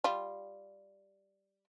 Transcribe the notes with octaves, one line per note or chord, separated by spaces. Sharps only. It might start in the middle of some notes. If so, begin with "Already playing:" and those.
G3 F4